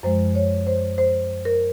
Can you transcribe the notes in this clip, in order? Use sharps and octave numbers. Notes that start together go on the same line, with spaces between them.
F#2 F3 G#3 C5
C#5
C5
C5
A#4